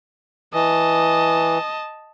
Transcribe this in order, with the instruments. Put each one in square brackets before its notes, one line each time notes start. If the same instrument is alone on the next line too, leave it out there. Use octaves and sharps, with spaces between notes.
[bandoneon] E3 [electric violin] D#5 A5